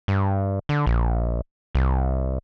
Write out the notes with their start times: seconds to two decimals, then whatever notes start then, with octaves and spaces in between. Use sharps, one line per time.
0.08 G2
0.69 D3
0.86 A#1
1.75 C2